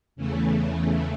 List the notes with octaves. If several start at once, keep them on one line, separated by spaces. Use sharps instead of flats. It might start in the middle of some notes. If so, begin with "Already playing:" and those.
E2 C#3 E3 A3